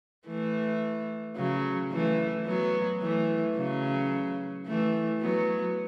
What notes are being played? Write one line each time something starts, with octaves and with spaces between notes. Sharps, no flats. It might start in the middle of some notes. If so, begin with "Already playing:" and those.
E3 A3
C#3 F#3
E3 A3
F#3 B3
E3 A3
C#3 F#3
E3 A3
F#3 B3